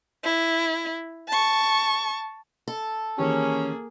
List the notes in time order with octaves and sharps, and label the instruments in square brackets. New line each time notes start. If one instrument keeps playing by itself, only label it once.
[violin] E4
A5 C#6
[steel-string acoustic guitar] A4
[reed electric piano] D#3 E3 G4 [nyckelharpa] A#3 G#4 [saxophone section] C#4